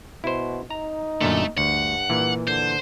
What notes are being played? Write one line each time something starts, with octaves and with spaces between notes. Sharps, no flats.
B2 E4 C5
D#4 A#5
F#2 A#2 D3 A3
D2 G2 F#5
A#2 E3
D3 C5